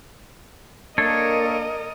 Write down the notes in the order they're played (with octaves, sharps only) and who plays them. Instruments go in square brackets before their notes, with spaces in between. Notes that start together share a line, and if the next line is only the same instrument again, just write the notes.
[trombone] A#3 [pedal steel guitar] D4 A4 C#5 [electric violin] A#4 D#5